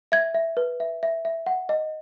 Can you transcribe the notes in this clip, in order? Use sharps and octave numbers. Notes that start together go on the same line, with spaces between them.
E5 G#6
E5
B4
E5
E5
E5
F#5
D#5